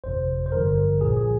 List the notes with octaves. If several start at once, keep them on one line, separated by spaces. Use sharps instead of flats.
G1 F2 C3 C5
C5
G#1 G2 D3 F3 A#4
C2 A#2 F3 G#4
G#4